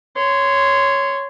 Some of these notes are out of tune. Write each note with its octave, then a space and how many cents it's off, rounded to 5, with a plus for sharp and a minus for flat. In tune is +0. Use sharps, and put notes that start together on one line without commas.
C#5 +0 C6 -15